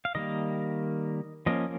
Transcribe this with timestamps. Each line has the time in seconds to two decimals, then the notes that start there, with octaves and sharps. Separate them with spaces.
0.05 F5
0.15 D#3 G3 A#3 D#5
1.46 F3 A#3 C#4 D#5